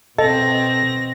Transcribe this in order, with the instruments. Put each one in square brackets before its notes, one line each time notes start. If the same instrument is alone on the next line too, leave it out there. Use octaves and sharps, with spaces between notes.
[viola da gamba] B2 C4 [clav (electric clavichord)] A4 [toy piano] D#5 [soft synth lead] A#6